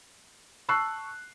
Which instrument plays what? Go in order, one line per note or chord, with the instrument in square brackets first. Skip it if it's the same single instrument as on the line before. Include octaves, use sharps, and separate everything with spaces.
[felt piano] A5 C#6 E6 F#6 C7